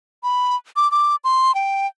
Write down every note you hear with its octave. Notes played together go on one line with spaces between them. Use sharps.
B5
D6
D6
C6
G5